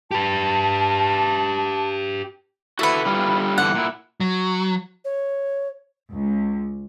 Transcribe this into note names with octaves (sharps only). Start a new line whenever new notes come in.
G4 B4 A5
E4 F#4 A4 B4 F#5
D3 G3 F4
G2 D3 E3 F#5
A#2 E4
F#3
C#5
C#2